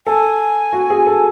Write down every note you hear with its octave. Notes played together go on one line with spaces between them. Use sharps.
A4 G#5
F#4
G#4
A4